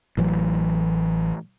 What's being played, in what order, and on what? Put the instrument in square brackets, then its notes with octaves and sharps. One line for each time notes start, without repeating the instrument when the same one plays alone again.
[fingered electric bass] A1 E3 F#3